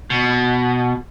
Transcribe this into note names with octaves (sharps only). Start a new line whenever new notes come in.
B2